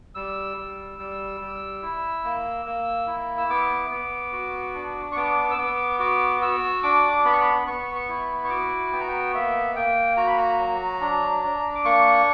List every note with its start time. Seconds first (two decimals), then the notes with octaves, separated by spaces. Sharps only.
0.15 G3 E6
0.57 G3
0.99 G3
1.41 G3
1.82 E4
2.24 A#3
2.66 A#3
3.07 E4
3.38 E6
3.49 B3 D6
3.91 B3
4.33 F#4
4.74 D4
5.12 C#6
5.16 B3 D6
5.51 E6
5.58 B3 D6
5.99 F#4 D6
6.41 F#4 E6
6.83 D4 D6
7.25 B3 B5
7.33 C#6
7.40 B5
7.67 B3 C#6
7.95 C#6
8.09 E4
8.44 C#6
8.50 F#4 D6
8.93 B3 G5
9.01 A#5
9.08 G5
9.35 A#3 E5
9.76 A#3 G5
10.17 F#4 A#5
10.27 B5
10.38 A#5
10.59 F#3
11.01 D4
11.43 D4
11.75 D6
11.85 A#3 C#6